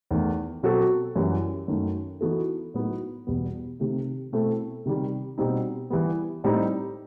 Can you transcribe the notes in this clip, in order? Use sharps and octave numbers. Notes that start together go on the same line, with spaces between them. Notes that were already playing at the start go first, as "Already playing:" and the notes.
E2 D#3 A3
B2 F#3 C4 F#4 A4
F#2 E3 G3
F#2 D#3 A3
E3 B3 D#4 F#4 A4
A2 F#3 B3 D#4 F#4
E2 B2 G3 B3
C3 D#3 A3
B2 A3 C4 E4 A4
C3 D#3 G3
B2 G3 C4 D#4
E3 G3 B3
A2 G3 C4 D#4